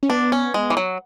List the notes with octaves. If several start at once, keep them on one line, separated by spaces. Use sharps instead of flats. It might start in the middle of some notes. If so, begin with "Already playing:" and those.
C#4
B3 D4
C#4
G#3
E3
F#3